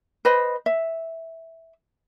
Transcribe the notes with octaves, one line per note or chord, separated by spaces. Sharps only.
B4 C5 D#5 B5
E5